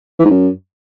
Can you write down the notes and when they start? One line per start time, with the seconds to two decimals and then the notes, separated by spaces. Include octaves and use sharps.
0.19 E3
0.25 G#2
0.30 F#2